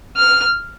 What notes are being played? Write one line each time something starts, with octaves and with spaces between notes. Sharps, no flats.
F6